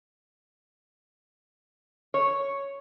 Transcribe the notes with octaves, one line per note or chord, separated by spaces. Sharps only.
C#5